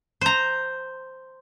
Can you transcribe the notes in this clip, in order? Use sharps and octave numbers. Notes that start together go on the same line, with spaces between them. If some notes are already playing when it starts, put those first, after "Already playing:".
C5 A#5